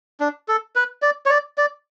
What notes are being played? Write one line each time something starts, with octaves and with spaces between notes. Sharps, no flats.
D4
A4
B4
D5
C#5
D5
D5